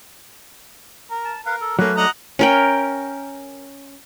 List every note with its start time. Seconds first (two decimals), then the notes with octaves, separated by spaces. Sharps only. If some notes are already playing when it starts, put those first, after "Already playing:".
1.11 A#4
1.25 A5
1.46 A#4 B4 F5
1.61 A4
1.79 F#3 A3 A#3 C#4 B4
1.97 D4 D#4 D#5 F#5 A#5
2.39 C#4 A#4 G5